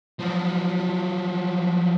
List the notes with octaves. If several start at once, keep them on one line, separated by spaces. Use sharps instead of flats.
F3 F#3